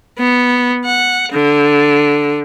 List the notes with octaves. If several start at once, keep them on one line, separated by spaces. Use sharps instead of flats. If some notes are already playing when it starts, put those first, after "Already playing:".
B3
F#5
D3